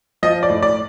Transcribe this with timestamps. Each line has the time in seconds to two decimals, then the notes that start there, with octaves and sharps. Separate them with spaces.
0.23 F3 D#5
0.43 D5
0.49 A2
0.62 D5